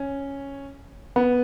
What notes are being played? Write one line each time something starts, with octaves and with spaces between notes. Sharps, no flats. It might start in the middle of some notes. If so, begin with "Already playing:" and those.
Already playing: C#4
B3